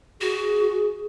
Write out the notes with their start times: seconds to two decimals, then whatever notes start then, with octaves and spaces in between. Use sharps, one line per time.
0.21 F#4 G#4